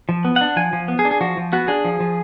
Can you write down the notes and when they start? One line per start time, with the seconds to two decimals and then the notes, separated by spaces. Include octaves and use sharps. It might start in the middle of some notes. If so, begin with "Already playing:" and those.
0.09 F3
0.25 B3
0.36 D4 F#5
0.56 F3 G#5
0.73 F3
0.88 B3
0.99 G#4
1.05 D4
1.11 G#4
1.21 F3 F#4
1.37 F3
1.53 B3 F#4
1.68 D4 G#4
1.85 F3
2.00 F3